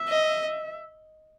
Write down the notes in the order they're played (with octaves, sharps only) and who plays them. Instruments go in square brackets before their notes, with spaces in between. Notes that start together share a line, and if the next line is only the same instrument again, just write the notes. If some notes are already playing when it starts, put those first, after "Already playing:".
Already playing: [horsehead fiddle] E5
[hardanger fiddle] D#5